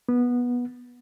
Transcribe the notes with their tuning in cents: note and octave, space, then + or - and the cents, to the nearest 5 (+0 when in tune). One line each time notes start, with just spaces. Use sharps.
B3 -15